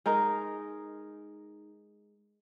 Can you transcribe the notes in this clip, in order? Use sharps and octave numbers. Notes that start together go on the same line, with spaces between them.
G#3 D#4 A#4